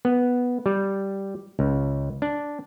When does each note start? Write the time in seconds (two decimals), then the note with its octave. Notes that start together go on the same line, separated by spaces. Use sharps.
0.05 B3
0.66 G3
1.59 C#2
2.22 D4